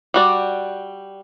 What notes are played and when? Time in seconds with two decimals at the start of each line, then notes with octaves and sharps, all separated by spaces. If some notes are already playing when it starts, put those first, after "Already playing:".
0.14 G3 F#4 D5